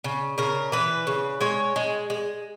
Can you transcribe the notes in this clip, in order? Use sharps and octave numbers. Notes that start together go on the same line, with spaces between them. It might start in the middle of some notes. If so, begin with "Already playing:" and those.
C#3
C#3 A#4
E3 B4
C#3
G#3 C#5
G#3
G#3